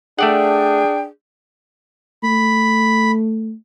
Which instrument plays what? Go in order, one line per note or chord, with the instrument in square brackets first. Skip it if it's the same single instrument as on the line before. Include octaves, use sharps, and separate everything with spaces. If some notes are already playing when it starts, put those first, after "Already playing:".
[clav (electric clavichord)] A3 D5 F#5 [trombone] D4 [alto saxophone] G#4 [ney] G5
[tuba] A3 [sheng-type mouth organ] B5